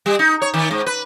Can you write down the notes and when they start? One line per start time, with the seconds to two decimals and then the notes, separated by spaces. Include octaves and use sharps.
0.06 G3
0.19 D#4
0.42 C#5
0.54 D#3
0.71 G#2
0.86 B4